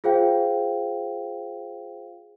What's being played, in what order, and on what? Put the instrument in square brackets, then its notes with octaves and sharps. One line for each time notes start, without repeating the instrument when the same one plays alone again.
[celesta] F4 G#4 C5 F5 G5